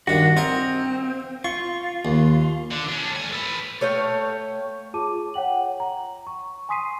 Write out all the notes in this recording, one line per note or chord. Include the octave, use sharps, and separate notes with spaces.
G2 D#3 D4 F#4
C4 F4 A#4 D#5
F4 C#6
D#2
D3
C#4 D4
A3 G#5
A4 B4
A3 C#5 F5 G5
F4 G#4 A5 D6 D#7
C#5 F#5 G5 F#7
A#5
A#5 C#6
G#5 C6 D#6 B6 C7 D#7